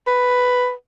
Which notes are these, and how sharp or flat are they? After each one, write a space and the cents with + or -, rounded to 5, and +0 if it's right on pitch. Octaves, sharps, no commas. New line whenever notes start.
B4 +5